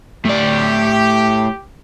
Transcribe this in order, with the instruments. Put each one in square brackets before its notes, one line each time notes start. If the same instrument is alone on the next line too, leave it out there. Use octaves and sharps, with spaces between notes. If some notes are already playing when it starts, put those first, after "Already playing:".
[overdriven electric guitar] A2 D5 [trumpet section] G4